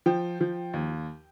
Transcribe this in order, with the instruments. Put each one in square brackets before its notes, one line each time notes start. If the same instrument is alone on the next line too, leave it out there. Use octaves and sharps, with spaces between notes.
[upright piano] F3 G5
F3
D#2